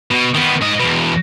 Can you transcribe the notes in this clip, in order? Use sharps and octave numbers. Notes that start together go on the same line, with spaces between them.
B2
D#3 B3
G#2 D#5
E2 B2